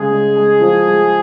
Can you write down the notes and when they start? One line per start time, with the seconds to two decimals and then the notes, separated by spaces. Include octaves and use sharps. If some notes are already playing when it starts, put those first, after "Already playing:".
Already playing: C#3 G#3 G#4
0.11 G#3
0.35 G#3
0.61 F3
0.87 G#3